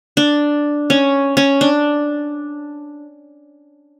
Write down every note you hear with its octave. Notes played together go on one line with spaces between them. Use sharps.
D4
C#4
C#4
D4